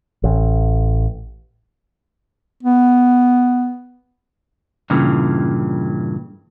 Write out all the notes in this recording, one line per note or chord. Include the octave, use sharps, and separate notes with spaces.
A1
B3
G2 A#2 C#3 E3